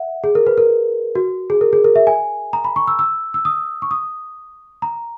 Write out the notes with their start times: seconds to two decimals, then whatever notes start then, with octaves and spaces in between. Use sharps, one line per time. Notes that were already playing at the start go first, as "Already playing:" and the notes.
Already playing: E5 F#5
0.24 G#4
0.35 A#4
0.46 B4
0.58 A#4
1.15 F#4
1.50 G#4
1.61 A#4
1.73 G#4
1.84 A#4
1.96 E5
2.07 G#5
2.53 A#5
2.64 B5
2.76 C#6
2.87 E6
2.99 E6
3.34 E6
3.45 D#6
3.82 C#6
3.91 D#6
4.82 A#5